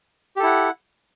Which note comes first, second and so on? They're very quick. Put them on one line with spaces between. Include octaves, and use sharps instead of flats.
G4 A4 E4 F#5